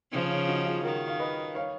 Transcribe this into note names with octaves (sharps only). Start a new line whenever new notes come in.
C#3 F3 D#4
C#4 F4
D#4 F#4
F4 G#4
D#3 F#4 A#4
F5
B4 D#5
C#5 F5